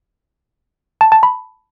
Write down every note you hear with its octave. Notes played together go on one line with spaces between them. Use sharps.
A5
A5
B5